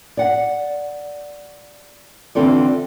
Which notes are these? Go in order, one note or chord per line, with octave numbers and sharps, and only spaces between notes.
D5 F#5
D3 E3 C4 F4 A4 D5